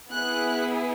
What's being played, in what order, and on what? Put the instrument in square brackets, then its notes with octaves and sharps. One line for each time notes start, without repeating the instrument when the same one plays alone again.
[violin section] B3 E4 G#4 F#6